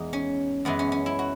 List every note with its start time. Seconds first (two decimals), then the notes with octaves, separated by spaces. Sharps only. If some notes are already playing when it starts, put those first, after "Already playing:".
Already playing: E2 G#3 D#4
0.13 C#4
0.65 F#2 E3 G#3 B3
0.79 C#4
0.92 C#4
1.06 E4
1.19 F#4